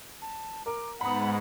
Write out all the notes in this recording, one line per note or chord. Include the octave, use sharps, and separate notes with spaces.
A5
A#4 D6
G#2 B3 F#5 A#5 B5 D#6